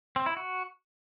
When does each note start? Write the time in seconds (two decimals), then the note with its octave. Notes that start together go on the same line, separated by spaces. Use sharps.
0.16 C4
0.26 E4
0.37 F#4